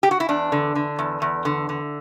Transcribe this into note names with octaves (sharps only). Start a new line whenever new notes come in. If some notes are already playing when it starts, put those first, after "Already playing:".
G4
F#4
E4
E2 D4
D3
D3
E2
E2
D3
D3